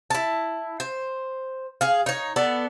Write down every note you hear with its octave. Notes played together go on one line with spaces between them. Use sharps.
E4 A5
C5
G#4 F5
D#4 C#5
B3 A4 D5